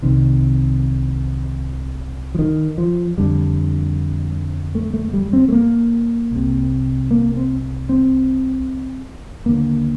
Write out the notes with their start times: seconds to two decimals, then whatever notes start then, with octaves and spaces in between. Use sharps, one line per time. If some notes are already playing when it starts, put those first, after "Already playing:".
0.02 C2 C3 D#3
2.35 F3
2.39 D#3
2.78 F3
3.17 F2 D3 G3
4.75 A3
4.94 A3
5.13 G3
5.33 C4
5.49 A3
5.53 A#3
6.31 C2 C3
7.11 A#3
7.36 C4
7.89 C4
9.46 D#2 D3 A#3